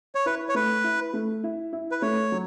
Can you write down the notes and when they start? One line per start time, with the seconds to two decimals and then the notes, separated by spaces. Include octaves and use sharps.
0.15 C#5
0.26 E4 B4
0.49 C#5
0.54 A3 B4
0.84 E4
1.13 A3
1.44 E4
1.73 E4
1.92 B4
2.02 A3 C#5
2.32 F#3